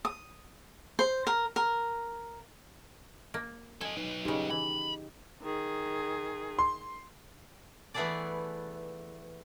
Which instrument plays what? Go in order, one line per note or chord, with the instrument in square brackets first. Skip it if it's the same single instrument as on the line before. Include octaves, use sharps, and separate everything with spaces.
[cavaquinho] D#6
C5
A#4
A#4
[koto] A#3
[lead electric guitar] A4 D#5 [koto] G#5
[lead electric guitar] F#3 B4 [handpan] D#4
[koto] A#2 C#3 [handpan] D#4 G4
[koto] E3 [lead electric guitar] B5
[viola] D#3 G#4
[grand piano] C6
[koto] E3 A3 B3 G#4 A4 D5